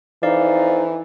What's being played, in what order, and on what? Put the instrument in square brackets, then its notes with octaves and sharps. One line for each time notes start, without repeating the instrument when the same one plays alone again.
[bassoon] F2 [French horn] E3 [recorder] D#4 [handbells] D5 F5